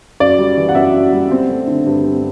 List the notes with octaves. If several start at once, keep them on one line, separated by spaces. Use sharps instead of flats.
F#2 D5
G3
E3
F#5
F#2 E5
F#2
G3
C4
A3
D3
G2
C4